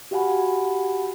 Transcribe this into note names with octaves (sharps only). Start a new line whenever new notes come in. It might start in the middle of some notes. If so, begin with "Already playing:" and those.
F#4 G4 F5 F#5 G#5 B5